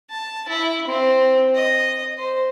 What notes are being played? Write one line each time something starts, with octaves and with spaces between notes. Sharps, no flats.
A5
E4
C4
D#5
C5